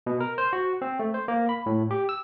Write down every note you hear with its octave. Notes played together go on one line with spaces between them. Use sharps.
B2
A#4
C5
F#4
C4
A3
C5
A#3
B5
A2
G4
E6